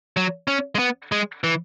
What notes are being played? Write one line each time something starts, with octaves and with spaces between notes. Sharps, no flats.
F#3
C#4
G#3
B3
G#3
E3